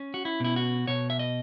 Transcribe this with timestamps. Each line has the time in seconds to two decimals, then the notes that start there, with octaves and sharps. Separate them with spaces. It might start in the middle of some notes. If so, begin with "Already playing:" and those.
Already playing: C#4
0.14 F#4
0.25 E4
0.40 B2 E4
0.56 F#4
0.87 B2 C#5
1.10 E5
1.19 D#5